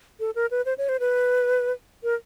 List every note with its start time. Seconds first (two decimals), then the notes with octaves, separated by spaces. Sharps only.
0.20 A4
0.35 A#4
0.51 B4
0.66 C5
0.78 C#5
0.89 C5
1.00 B4
2.03 A#4